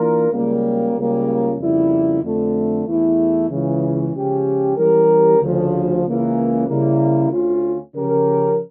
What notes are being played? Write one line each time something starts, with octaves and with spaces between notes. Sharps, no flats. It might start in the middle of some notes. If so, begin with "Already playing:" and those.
Already playing: E3 A#3 D4 F4 A#4
C#2 C#3 G3 A#3
C#2 C#3 G3 A#3
F2 C#3 G3 A#3 E4
F2 D3 A3
E2 E3 A3 E4
C#2 C#3 E3
C#2 C#3 F3 C#4 G4
E3 G3 C#4 G4 A#4
D2 C#3 F3
C#2 C#3 E3 A#3
C#3 G3 A#3 E4
D2 D3 A3 C#4 F4
C#3 F3 C#4 G4 A#4